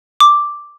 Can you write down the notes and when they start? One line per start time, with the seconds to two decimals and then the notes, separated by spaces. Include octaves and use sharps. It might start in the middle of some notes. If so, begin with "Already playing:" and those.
0.20 D6